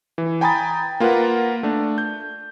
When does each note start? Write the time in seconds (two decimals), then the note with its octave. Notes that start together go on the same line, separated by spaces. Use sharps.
0.18 E3
0.41 G5 G#5 A#5 B5 D#6 A6
1.00 A#3 F4 A#4 B4 F#5
1.63 A3 D4
1.98 G6